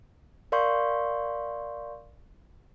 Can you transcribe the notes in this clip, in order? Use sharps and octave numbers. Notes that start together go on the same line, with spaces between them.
A#4 D5 F5 C6 C#6 G6